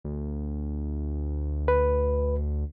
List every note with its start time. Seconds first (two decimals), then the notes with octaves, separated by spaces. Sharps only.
0.04 D2
1.68 B4